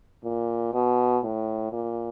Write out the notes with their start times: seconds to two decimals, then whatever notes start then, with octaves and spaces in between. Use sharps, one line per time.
0.24 A#2
0.73 B2
1.23 A2
1.72 A#2